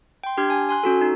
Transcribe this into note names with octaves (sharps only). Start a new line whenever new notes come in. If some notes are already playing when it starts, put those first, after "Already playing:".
G5 C6
D4 G4 C6 F6 G#6
G#5
G#5 C6 F#6
C#4 F#4 A4
D#4